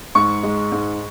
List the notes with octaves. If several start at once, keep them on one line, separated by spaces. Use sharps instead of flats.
G#2 C#6
G#3
G#2